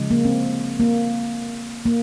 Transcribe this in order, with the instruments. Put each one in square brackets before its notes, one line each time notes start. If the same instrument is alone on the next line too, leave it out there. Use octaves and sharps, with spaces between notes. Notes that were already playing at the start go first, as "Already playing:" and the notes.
Already playing: [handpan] C#3 F3 G#3
A#3
C4
A#3
A#3